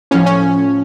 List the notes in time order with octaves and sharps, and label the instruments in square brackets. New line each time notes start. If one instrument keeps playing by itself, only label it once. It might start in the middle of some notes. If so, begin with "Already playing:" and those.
[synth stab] A2 F3 C#4
C#4